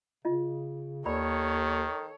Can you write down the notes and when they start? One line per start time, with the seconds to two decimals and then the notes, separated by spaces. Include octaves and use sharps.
0.25 C#3 F4 D#5
1.06 D#2 D#3 A4 A#4 C#5 D5 B5